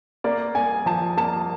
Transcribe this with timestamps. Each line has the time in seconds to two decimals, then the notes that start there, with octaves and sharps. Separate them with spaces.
0.24 A#3 D5
0.55 A#3 G#5
0.86 F3 A5
1.17 A#3 A5